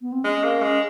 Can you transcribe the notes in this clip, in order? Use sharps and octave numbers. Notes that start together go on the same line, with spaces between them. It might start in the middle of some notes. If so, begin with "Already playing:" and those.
B3
C4
G#3 C#4
A#3
G#3